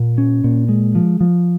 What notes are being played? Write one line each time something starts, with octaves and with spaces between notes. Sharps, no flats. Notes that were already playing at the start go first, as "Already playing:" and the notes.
Already playing: A#2
C#4
A#2
G#3
F3
F3